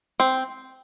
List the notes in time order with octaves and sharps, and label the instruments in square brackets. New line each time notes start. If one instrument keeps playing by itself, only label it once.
[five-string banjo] C4